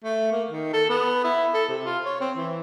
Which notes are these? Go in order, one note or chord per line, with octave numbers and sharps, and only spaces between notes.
A3
A#3
D#3
A4
B3
E4
A4
C3
F4
C#5
C4
E3